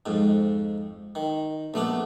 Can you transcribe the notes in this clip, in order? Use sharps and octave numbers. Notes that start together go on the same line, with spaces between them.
F2 G#2
D#3
A#1 A3 B3 D4